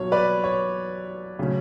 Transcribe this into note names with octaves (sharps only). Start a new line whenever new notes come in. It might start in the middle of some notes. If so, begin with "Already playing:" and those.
Already playing: B1 F#3 C#5
B4 D5
C#5
C#3 F#3 A3 C#4